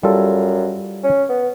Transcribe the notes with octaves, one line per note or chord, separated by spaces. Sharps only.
F#2 G3 F4 A4
C#4
B3